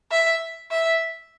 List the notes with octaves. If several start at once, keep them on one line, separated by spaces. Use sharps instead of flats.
E5
E5